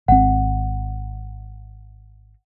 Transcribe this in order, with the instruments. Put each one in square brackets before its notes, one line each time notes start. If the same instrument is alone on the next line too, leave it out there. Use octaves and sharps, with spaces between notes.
[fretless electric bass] G#1 C4 [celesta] F#5